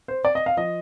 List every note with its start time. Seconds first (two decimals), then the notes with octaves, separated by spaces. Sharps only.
0.08 C5
0.25 D5
0.35 D#5
0.46 F5
0.57 F3 D#5